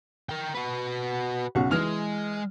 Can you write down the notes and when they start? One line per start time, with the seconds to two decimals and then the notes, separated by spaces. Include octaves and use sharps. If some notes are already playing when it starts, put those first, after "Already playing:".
0.29 A#4 G5
0.55 F#4 B4
1.55 B1 C#3 F#4
1.71 E3 G#3 F6 F7